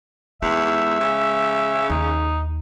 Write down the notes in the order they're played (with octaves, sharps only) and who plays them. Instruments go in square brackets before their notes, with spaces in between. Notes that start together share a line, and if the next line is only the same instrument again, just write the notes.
[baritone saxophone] E2 [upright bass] G#3 [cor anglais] E5
[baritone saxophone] C#3
[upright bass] D#2 [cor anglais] D#4